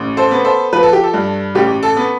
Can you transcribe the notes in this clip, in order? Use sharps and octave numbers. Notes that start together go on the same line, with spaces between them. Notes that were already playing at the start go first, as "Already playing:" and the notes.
Already playing: A1
A4 C5
B3
A4 C5
F3 B4
A4
G4
A4
G2
A1 G4
A4
B3